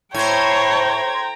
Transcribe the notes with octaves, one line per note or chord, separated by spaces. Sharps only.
A2 C5 C#5 G5 A#5 G#6